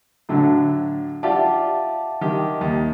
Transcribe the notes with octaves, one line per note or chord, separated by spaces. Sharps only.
A2 D3 F#3
F4 G4 D5 E5 F#5 A5
D#3 G4
D#2